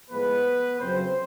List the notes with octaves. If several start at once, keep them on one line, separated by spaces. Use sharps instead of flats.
A2 F3 G#3 B3 B4
F2 C#3 F#3 C4 C5